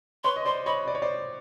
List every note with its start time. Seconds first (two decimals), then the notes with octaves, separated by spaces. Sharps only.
0.24 B4 C#5 C6
0.36 D#5
0.45 C5 D5 C6
0.66 C#5 D#5 B5
0.87 D5
0.95 C#5
1.02 C5 D5